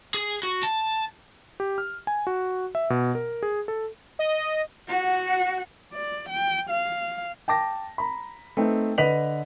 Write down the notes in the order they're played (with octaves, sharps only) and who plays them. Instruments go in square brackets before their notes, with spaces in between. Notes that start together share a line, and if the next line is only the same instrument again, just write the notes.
[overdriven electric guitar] G#4
F#4
A5
[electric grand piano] G4
F6
G#5
F#4
E5
B2
A#4
G#4
A4
[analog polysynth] D#5
[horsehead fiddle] F#4 F#5
D5
G5
F5
[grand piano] G5 A5 D6 A#6
A#5 B5
A3 C4 D#4 A4 B4
D3 B4 D#5 B6 F7 F#7